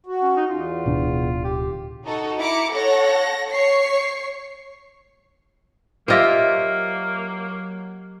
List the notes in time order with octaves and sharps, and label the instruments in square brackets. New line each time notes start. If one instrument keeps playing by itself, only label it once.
[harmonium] F#4
[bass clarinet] C#4
D#4
[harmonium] E2 [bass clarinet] F4
[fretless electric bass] D1 B2 D4
[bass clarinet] G4
[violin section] D#4 F#4 A4
E4 A#5 D6 C#7
A4 C#5 F#5 A#6
C#5 C#6 C7
[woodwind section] F#3 [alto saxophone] A#3 [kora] F4 C5 [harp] G4 D#5 E5